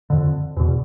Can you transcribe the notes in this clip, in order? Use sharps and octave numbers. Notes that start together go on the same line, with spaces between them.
F2 D3
E2 B2